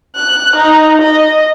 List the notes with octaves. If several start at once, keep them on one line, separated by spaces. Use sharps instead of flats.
F#6
D#4
D#5